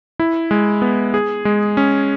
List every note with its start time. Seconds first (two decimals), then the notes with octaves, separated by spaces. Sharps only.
0.20 E4
0.51 G#3
0.82 B3
1.14 G#4
1.45 G#3
1.77 C#4